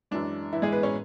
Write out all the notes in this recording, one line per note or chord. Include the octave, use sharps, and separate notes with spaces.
F#2 E3 G#3 D4
E3 E4
G#3 G#4
B3 B4
C#4 C#5